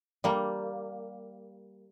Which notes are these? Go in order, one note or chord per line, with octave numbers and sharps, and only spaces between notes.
G3 A#3